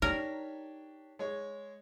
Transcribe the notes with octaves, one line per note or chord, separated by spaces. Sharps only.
D4 D#4 G4 A#4 C#5
G#3 C#5